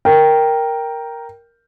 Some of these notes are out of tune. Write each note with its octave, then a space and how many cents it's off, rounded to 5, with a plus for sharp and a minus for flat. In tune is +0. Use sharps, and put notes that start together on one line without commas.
A#4 +0 G5 +0